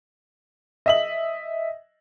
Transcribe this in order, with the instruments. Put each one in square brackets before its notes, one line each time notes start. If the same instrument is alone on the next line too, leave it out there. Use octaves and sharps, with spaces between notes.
[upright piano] D#5 E5 F#7